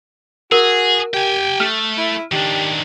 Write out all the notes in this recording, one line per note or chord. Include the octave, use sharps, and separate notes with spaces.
F#4 G#4 A#4
G4 G5 G#5
A3 F6
E4
D#3 D4 G4